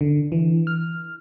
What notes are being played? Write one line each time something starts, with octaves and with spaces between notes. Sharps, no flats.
D3
E3
F6